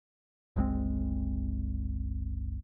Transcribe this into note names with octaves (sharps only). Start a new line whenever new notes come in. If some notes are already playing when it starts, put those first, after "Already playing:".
F#1 C2 G#3 C4